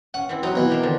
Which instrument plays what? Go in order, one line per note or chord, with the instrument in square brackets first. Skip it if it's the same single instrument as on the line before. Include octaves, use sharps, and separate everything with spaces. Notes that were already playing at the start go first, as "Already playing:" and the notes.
[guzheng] C#4 [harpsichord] F#5
[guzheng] E3 C4 E4
[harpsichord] F#3 [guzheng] D#4 F#4
[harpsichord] B2 E3
[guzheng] G4 A#4 C5
D3 D#3 F3